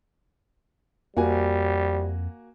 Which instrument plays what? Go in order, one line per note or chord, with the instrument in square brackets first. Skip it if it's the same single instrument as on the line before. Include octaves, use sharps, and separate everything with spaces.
[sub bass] F2 [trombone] G3 [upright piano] A#3 F#4 G#5